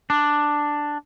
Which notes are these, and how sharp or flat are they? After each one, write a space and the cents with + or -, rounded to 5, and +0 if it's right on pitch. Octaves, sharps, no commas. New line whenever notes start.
D4 +5